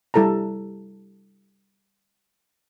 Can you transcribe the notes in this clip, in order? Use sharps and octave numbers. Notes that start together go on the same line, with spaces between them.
G3 E4 A4 A5 A#5